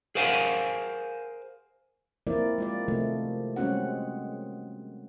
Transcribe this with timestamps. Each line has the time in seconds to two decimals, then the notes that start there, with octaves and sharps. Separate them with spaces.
0.15 G#4 A#4 C5 F5 F#5 G#5
2.27 F3 A#3 C4 E4 A#4 D5
2.58 G#3 F4 D5
2.88 C3 D#3 F3 A3
3.56 G3 G#3 C4 C#4 F#4 F#5